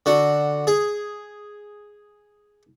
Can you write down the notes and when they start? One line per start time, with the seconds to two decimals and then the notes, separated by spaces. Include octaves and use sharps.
0.06 D3 F#4
0.67 G#4